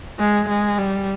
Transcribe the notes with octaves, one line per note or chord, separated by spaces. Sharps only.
G#3
G#3
G3